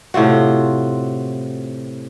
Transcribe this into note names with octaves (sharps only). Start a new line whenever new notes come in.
A2 C3 F4 F#4